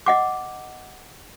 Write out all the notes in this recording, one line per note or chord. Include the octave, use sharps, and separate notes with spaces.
D#5 F#5 D6